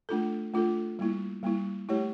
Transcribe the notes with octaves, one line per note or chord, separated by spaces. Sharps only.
A3 D4 F4 A4
A3 D4 F4 A4
G3 A#3 E4
G3 A#3 E4
A3 E4 G4 C#5